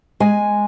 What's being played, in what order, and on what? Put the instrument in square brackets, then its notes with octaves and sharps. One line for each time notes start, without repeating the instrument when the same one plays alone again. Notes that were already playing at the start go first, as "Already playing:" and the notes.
[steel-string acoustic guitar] G#3 G#5